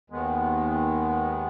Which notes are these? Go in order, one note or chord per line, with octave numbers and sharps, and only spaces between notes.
D#2 D#3 G#3 B3